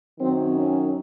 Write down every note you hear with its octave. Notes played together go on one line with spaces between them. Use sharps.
F#2 D#3 F#3 C4
C#4